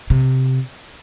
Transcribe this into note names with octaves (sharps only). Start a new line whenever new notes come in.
C3